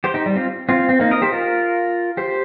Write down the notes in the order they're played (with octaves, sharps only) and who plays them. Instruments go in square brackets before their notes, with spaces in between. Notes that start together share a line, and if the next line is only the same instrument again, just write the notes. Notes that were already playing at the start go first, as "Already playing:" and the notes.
[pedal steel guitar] G4 C5
D#4 G4
G3
C4 F4
C4 F4
C4
A#3 D#4
A#4 D#5
G4 C5
F4 A#4
G4 C5